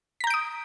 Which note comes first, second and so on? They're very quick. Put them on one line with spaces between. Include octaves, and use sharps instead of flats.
B6 A#5 G6 D7 D#6